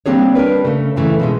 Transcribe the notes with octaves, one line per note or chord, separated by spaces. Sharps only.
G3 A#3 C4 D4 G#4 C#5
G3 D4 A#4 B4
C#3 A3
F#2 A2 C#3 E3 A3 E4
B2 F3 G#3